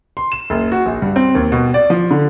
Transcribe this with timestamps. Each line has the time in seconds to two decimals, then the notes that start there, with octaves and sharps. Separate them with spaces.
0.17 C6
0.32 E7
0.50 F#1
0.72 F#4
0.86 A#1
1.02 G2
1.16 C4
1.35 D#2
1.52 B2
1.74 D5
1.90 F3
2.11 D3